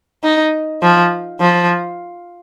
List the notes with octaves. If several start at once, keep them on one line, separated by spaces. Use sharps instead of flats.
D#4
F3
F3